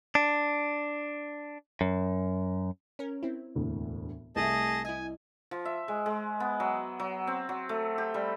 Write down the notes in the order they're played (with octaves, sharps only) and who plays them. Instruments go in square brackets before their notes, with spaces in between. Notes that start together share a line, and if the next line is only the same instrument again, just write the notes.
[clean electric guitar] D4
F#2
[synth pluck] C#4 A#4
C4 E4
[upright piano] E1 D2 A2
[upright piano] C2 E5 [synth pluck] A3 [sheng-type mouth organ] G#4 D#5 A5
[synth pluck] E4 D#5 [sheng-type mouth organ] G#5
[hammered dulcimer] F3
E5
G#3
G#3
B3
F#3
F#3
C4
F#3
A3
G4
G3